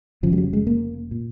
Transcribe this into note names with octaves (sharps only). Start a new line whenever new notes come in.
F1 E2 C#3 F3
G3
F#3
G#3
A#3
A#2